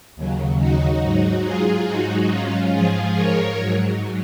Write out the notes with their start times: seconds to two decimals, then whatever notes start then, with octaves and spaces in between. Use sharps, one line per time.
0.16 D#2 C#3 F#3
0.60 D#4 F#4
1.02 G#2 F#3
1.45 F4 G#4
1.87 G#2 F#3 D#4 F#4
2.31 C#4 F4
2.73 G#2 F3 F4 G#4
3.16 A#4 C#5
3.59 G#2 F#3